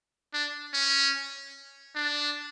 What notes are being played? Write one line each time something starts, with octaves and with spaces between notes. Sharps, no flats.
D4
C#4
D4